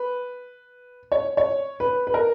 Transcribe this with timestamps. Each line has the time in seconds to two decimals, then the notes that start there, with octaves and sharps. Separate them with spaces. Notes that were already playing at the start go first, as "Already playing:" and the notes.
Already playing: B4
1.12 C#5
1.37 C#5
1.80 B4
2.07 B4
2.14 A#4